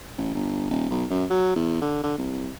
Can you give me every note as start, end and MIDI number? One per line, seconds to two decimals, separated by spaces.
0.18 0.31 33
0.35 0.68 31
0.70 0.85 27
0.90 1.05 35
1.10 1.24 42
1.30 1.54 54
1.56 1.81 40
1.81 1.99 50
2.04 2.15 50
2.18 2.49 36